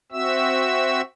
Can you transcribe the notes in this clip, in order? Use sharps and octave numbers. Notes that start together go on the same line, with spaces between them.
C4 F#4 E5 E6